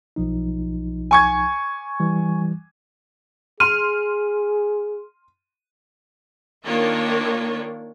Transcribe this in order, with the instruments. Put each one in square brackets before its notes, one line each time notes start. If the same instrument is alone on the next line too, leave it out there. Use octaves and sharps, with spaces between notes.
[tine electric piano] B1 F3 D#4
[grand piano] G#5 C#6 G#6
[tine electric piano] E3 G3
[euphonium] G#4 [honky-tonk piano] C6 F6 [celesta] D#7
[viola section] D#3 A#3 D4 F4 C#5